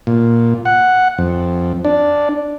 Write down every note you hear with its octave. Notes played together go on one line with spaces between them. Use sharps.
A#2
F#5
F2
D4